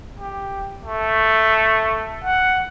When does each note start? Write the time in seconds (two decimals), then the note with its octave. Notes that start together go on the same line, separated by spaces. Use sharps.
0.20 G4
0.85 A3
2.24 F#5